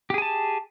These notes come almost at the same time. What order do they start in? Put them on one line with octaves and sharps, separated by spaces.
G4 G#4 G#5 A5